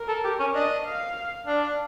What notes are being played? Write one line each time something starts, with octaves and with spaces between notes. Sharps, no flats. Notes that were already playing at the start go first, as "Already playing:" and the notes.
Already playing: A#4
A4
G4
C#4
D4 D#5
F5
D4 F5